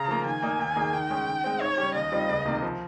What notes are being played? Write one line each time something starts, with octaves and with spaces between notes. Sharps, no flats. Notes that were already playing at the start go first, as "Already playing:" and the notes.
Already playing: C#3 A#5
F3 A#3 F4
D#3 G#5
A#3 D#4
D#2
D#3 A#3 D#4 G#4
D#3 G5
G#3 C#4 G#4
D#3
G#3 C4
G#2 C#5
G3 C#4 G4
D#2 D#5
D#3 G3 C4 F4
C#2
C3 D#3 A#3
F3